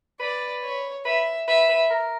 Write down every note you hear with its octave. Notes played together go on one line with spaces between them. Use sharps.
B4 D5
C#5
B4 E5
B4 E5
B4
A#4